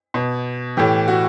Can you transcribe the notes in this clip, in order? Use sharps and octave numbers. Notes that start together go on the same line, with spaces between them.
B2
A2 E3 G4
F#4